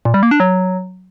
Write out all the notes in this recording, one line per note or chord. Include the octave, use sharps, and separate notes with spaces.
A#2
G3
A#3
D4
F#3